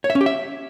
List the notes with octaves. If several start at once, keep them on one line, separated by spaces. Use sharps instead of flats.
C#5
E5
C#4
G4
E5